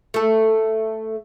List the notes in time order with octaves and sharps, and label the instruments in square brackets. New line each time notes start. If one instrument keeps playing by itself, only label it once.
[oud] A3 A4